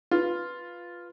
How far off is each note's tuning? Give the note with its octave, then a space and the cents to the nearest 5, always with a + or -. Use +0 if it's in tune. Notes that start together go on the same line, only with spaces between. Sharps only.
F4 +0 B4 +0